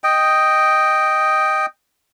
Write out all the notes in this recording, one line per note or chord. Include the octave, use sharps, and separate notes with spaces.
D#5 G5